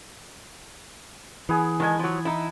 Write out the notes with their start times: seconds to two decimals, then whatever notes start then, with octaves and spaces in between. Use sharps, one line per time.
1.49 E3 B3 G#4
1.80 D#3 G#3 G#5 A5
1.99 F3 F#3
2.25 D#4 E4